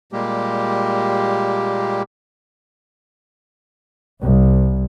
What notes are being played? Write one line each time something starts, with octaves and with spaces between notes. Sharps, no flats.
A#2 G3 G#3 A#3 G4
C2